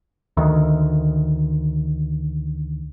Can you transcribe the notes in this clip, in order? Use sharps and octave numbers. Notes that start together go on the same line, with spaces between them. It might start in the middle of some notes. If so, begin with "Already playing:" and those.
D2 D#3